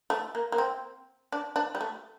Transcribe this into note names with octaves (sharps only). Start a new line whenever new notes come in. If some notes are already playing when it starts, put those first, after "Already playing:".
A3
A#3
A#3
C4
D4
D4
G3
A3